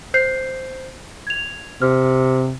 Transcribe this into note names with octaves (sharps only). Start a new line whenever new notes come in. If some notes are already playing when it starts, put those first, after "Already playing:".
C5 G6 C7
G#6 F7
C3 F6